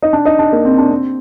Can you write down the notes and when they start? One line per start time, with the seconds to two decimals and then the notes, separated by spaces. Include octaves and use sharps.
0.03 D#4
0.13 D4
0.25 D#4
0.39 D4
0.52 A#3
0.65 C4
0.78 D4
0.91 C4